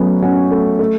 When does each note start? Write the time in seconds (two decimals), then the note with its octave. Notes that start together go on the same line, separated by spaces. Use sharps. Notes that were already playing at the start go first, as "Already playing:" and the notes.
Already playing: F#3 A3 B3 C#4
0.22 C#4 F#4
0.51 A3
0.79 A3